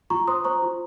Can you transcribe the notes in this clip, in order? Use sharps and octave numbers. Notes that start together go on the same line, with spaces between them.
F4 A#5 C#6
C5 C6 D#6
C5 A#5 C#6
F4